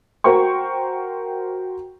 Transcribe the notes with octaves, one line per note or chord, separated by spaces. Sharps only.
F#4 A#4 C5 G5 C#6